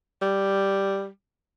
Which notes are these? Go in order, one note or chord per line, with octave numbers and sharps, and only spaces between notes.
G3